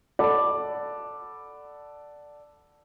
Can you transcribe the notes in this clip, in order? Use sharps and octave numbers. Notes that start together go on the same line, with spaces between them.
A4 D5 F#5 A5 B5 D6